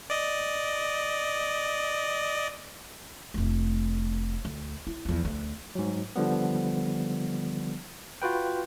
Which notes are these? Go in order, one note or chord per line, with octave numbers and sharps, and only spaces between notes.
D5 D#5
F1 A3
D2
E4
E2 F3
D2
G#2 F#3
D3 F3 G3 B3
F4 F#4 B4 G5